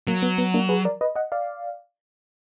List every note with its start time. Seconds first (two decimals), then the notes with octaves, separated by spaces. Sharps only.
0.07 F#3 A#3
0.22 B3
0.38 B3
0.54 A#3 D4
0.69 G#4 B4
0.85 A#4 D5
1.01 B4 D#5
1.15 D#5 F#5
1.32 D5 F5